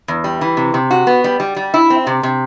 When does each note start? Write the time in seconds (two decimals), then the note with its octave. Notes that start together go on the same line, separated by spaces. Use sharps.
0.08 E2
0.24 G3
0.41 E3
0.57 C3
0.74 C3
0.91 F#4
1.07 B3
1.24 G3
1.40 G3
1.56 G3
1.74 E4
1.90 C4
2.07 C3
2.23 C3